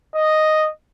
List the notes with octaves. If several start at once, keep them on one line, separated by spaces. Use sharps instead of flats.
D#5